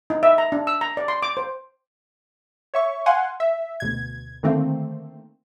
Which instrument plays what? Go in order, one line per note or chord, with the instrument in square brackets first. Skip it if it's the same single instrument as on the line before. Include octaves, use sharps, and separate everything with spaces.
[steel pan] D#4
E5
A#5
D4
E6
A#5
D5
C6
D6
C5
[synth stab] C#5 E5 C#6
F5 F#5 G#5 C6
E5
D2 B2 G#6
D3 D#3 A3 A#3 C4